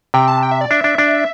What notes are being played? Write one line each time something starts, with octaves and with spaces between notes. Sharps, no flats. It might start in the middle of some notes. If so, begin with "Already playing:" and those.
C3 G5
A5
G5
E5
D5
D4 E5
D4
D4